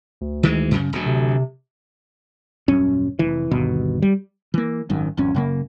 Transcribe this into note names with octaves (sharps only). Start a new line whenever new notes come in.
D2
D#3 E3 G#3
F#2 C#3
D1 D2 F#3
C3
D#1 F#2 C#4
F1 E3
G1 D#2 B2
G3
E3 A#3
G#1 F#2 D#3
G#1 F2 C#4
F#2 C#3 A#3